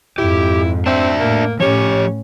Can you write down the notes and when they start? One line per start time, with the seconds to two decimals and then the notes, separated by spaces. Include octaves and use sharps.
0.18 F2 G#2 E4 G4
0.86 C4 D4 E5
1.20 A2 A#3
1.60 A2 F3 C#4 G4 C#5